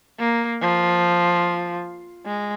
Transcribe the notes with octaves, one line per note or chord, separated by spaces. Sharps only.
A#3
F3
G#3